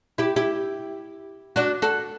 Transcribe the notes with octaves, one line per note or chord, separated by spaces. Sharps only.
E4 G4
E4 G4
D4 F#4
F#4 A4